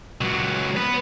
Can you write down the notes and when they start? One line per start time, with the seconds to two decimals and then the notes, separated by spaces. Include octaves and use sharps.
0.21 C#2 F#3
0.77 B3